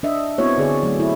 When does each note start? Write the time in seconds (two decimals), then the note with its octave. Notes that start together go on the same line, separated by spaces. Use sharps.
0.03 D4 D#5 E5
0.38 B3 C4 E4 F#4 C#5
0.58 D3 G#4 D5
0.83 F#3 A3
1.00 E4